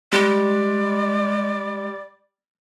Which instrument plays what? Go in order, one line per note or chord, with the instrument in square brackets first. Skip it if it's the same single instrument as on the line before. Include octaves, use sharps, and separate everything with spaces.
[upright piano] G3 [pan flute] G#3 [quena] D5